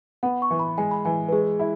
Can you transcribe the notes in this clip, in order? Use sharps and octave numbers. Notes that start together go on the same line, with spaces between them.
B3 F#5
C#6
E3
B5
G#3 G#5
B5
E3 G#5
B4
G#3 G#4
E4